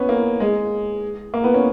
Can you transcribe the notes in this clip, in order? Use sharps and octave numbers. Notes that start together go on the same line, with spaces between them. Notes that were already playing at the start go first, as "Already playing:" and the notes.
Already playing: B3 C#4
A#3
G#3
A#3
B3
C#4